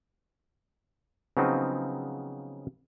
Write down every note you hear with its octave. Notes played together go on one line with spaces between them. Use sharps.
C#3 F3 F#3 B3 C4 D#4